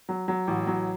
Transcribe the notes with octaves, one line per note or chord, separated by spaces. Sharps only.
F#3
F#3
A1
F#3